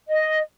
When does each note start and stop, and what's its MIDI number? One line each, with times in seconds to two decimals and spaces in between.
0.08 0.38 75